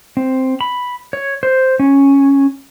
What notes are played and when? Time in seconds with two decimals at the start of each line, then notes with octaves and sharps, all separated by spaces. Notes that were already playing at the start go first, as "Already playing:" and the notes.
0.17 C4
0.61 B5
1.13 C#5
1.43 C5
1.80 C#4